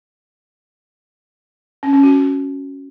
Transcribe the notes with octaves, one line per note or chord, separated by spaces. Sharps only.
C#4
C#4
F#4